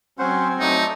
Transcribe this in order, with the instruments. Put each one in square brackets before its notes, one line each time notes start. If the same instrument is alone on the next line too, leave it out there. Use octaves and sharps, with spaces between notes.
[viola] F#3 G#5 [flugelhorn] C4 [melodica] C#4 C5 F#5
[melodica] F#3 A3 [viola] D4 [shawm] D#4